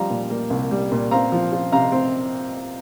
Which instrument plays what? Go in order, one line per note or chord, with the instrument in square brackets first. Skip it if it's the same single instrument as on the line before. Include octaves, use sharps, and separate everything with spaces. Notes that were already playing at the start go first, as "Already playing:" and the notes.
Already playing: [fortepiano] F3 G3 F5 A#5
A#2
A#3
C2
G3
A#2
C4 F5 A#5
F3
F4
C3 F5 A#5
C4